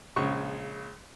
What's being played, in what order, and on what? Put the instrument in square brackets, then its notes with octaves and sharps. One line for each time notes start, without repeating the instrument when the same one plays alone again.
[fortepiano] A#1 C#3 G#3 C#6